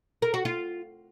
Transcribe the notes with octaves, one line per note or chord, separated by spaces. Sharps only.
A#4
F#4
F4